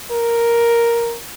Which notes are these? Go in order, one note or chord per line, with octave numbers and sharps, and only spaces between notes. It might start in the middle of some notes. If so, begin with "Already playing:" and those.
A#4